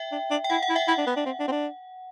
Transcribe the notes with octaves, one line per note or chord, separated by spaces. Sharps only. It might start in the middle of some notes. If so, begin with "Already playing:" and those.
Already playing: E5 G5
D4
D4
G5
E4 F#5
F#5
E4
E5 G5
E4 F#5
D4
B3
D4
C4
D4
C4
D4